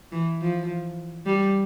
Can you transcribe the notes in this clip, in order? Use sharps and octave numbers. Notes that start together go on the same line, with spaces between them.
E3
F3
G3